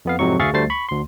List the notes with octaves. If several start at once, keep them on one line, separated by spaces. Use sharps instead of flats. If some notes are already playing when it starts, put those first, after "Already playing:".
F2 B3 F5
F2 G#2 C3 F#3 C#6
D2 G#4 E5 F5 C#6 A6
D2 G3 A3 C5 A6 C7
B5 C#6
D2 C6